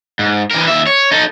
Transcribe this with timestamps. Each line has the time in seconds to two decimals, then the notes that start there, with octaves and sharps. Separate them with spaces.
0.19 G#2
0.51 E3 A#4
0.68 D#2 E5
0.87 C#5
1.12 D#4 A4